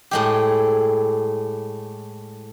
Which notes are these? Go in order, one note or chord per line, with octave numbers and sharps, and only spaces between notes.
A2 G#3 G4